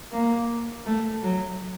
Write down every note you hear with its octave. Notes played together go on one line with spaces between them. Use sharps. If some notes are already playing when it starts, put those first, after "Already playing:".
A#3
A3
F#3